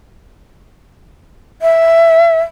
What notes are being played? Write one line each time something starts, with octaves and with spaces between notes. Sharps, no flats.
E5